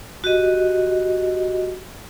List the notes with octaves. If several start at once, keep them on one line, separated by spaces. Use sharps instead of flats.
F#4 G4 D#5